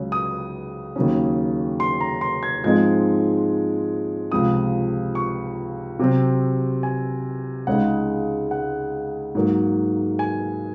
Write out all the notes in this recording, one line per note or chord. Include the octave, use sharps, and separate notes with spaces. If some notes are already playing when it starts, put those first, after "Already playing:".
Already playing: C#2 C#3 F#3 C#4
D#6
D#2 C#3 F#3 C#4
C6
A#5
C6
G#6
G#2 F3 G#3 C4 D#4 G#6
C#2 C3 F3 D#6
C#6
C3 F#3 C4
G#5
C#2 C#3 G#3 D#4 F#5
F#5
G#2 F#3 A#3
G#5